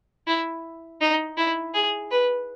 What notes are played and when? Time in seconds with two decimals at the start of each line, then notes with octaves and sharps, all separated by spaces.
0.27 E4
1.01 D#4
1.37 E4
1.74 G#4
2.11 B4